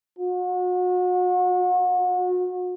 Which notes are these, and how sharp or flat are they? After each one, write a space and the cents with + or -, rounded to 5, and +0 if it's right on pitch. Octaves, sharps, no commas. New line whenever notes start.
F#4 -35